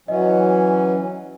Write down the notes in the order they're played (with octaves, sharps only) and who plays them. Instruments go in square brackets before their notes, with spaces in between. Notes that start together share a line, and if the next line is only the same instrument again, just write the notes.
[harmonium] E3 F#3 C#4 [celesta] D#5